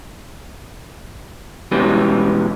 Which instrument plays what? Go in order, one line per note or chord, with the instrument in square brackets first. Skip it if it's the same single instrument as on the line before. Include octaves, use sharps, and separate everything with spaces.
[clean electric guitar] B2 E3 G3 G#3 C#4